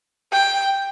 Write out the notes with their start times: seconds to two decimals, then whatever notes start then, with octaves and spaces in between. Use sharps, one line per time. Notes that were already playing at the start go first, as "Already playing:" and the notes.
0.33 G5